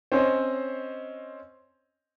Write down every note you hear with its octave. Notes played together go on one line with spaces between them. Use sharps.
C4 C#4 C5 C#5 D#5